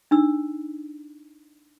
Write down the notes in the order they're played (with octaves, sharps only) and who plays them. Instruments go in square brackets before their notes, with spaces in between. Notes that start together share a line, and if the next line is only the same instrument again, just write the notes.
[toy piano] D4 D#4 E6